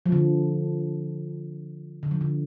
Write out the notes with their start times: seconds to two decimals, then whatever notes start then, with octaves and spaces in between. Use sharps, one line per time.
0.06 F3
0.12 D3
2.03 D3
2.11 F3
2.21 D3